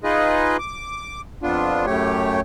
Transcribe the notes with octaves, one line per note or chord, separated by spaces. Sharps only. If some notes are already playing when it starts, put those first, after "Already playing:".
D#4 F4 G#4 B4 D#5
D6
F2 B3 D4 F4
F#2 A2 A3 G4 C#5